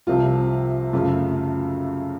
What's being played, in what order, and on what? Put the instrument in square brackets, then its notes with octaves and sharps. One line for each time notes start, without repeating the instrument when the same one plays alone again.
[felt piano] C2 C3 F3 [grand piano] F4
[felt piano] F#2 C#3 A3 [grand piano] F4